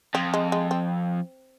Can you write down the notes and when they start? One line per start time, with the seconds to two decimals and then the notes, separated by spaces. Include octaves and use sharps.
0.14 F2 C4
0.34 G#3
0.52 G#3
0.71 C4